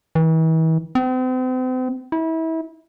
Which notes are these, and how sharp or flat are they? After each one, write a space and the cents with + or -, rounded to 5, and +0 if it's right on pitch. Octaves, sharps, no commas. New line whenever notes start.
E3 -40
C4 -40
E4 -30